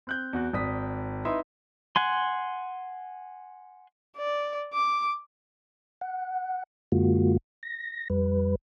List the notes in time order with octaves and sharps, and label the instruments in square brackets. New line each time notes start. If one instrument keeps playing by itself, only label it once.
[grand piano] C4 F#6 G6
E2 F#4 F#6
G#1 D5 D#6 B6
D#4 E4 B4 E5 C6 D#6
[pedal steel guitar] F#5 G#5 C6
[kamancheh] D5
D6
[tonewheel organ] F#5
F#2 D3 G#3 A#3 F4 F#4
A#6
F2 G3 B4